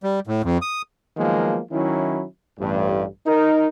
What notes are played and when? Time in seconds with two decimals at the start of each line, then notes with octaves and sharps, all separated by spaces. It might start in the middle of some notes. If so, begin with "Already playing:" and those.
0.03 G3
0.27 A2
0.44 F2
0.62 D#6
1.17 D#3 F3 F#3 G#3 A#3 B3
1.72 D#3 F#3 C#4 E4
2.59 A1 G2
3.27 D#4 A#4